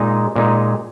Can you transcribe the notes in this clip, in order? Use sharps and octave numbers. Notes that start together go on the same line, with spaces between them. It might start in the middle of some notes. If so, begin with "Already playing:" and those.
Already playing: A#2 G#3 D#4
A#2 G#3 D#4